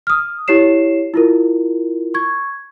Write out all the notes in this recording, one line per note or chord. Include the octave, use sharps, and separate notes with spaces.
D#6 F6
E4 G4 C#5 C7 E7
E4 F4 A#4
C#6 G#6